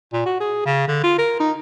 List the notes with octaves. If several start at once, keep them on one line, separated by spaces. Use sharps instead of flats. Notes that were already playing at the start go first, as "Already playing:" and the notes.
A#2
F#4
G#4
C#3
D3
F4
A#4
D#4